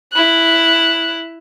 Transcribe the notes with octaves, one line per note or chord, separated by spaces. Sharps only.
E4 F#6